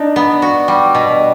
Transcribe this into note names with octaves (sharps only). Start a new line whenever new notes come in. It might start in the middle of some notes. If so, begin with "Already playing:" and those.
Already playing: D4 D#4
B3
F#4
G3
B2